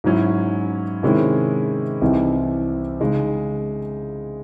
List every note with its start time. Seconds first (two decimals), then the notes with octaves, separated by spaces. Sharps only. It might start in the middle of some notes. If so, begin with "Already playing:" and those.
0.04 G#2 F#3 C#4 E4
1.03 C3 D#3 G#3 C#4 E4
2.02 C2 C3 E3 C4 D#4
3.00 C#3 G#3 D#4